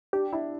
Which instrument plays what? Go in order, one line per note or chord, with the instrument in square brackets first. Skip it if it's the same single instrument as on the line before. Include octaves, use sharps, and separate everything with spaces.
[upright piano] D4 [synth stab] G4
[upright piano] D4 [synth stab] E4